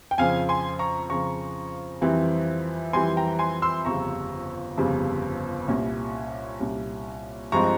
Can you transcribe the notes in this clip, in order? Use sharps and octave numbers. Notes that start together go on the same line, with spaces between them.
G5
F2 C#3 F3 F5 G#5
G#5 C6
A#5 C#6
F2 C#3 F3 A#5 C#6
F2 E3 G3 C4
F2 E3 G3 C4 G#5 C6
G5 A#5
G#5 C6
C6 E6
G1 F2 C#3 G3 A#5 C#6
G1 F2 C#3 G3
C2 A#2 G3 C#4
C2 A#2 G3 C#4
G2 F3 G#3 C4 A#5 C#6